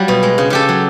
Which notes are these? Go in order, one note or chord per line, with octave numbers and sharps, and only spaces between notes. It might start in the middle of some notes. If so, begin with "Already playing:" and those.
Already playing: F#3 G3 F4
B2
G#3
C#3
C#3 G4 A4
F#3